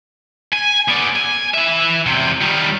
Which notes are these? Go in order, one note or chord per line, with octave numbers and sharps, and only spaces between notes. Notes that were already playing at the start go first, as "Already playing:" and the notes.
G#5
B3 D5
G#5
E3 E5
E2 C3
D#3 G3